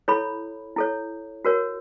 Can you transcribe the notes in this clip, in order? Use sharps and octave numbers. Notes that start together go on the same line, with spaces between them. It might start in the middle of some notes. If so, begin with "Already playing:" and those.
E4 A4 C#5 B5
E4 A4 C#5
F#4 A#4 C#5